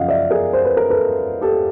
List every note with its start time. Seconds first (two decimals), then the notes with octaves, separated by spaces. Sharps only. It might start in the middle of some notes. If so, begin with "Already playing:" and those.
Already playing: F#2 C#3 F3 D#5 F5 F#5
0.08 D5 E5
0.30 G#4 A#4
0.53 C5
0.65 B4
0.77 A#4
0.90 A4 B4
1.41 G4 A4